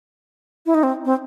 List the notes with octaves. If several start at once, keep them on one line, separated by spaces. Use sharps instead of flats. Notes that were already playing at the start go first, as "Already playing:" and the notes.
E4
D#4
C4
C4